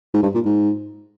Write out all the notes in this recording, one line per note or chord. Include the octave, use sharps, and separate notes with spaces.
G#2
G2
A#2
G#2